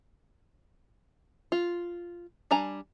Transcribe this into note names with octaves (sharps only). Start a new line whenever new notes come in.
F4
G3 D4 G#5 A#5